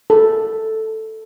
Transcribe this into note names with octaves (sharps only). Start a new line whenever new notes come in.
A4